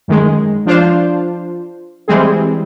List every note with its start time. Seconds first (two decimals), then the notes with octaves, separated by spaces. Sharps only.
0.08 F#2 D#3 G#3
0.66 F3 D4 F4 C5
2.08 E3 G3 G#3 C4 G#4